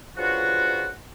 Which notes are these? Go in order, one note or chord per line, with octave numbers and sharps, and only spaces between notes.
G2 C#3 F3 F4 F#4